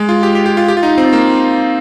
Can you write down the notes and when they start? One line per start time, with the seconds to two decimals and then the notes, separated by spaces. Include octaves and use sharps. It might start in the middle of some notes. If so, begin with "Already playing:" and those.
Already playing: G#3
0.09 F4
0.23 G4
0.35 G4
0.46 G4
0.57 F4
0.68 G4
0.77 F4
0.83 D#4
0.98 C4
1.13 A#3